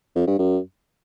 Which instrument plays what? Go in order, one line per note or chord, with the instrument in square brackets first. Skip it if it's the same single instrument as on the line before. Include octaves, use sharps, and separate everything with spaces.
[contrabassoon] F2
G2
F#2